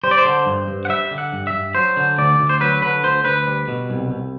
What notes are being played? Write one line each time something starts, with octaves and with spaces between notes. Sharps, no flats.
G3 C5
D5
C5
D3
G2
G2
F#5
G3 E5
D3
F#5
G2
E5
G2
F#3 C5
D3
D2 D5
D2
C5
F#3 B4
D3 B4
D2 C5
D2 B4
G3
B2
C2
C2